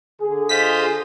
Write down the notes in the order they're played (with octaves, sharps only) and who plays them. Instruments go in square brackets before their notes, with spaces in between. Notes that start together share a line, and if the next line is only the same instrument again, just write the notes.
[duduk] D3 [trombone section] G#4
[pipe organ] F4 C5 D#5 [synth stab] B6